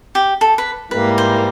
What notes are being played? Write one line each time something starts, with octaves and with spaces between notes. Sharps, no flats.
G4
A4
B4
G#2 E3 G3 A#3 B4
C5